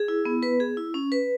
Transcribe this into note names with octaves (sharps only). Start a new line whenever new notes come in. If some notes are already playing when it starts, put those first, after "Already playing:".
Already playing: G#4
E4
B3
B4
G#4
E4
C#4
B4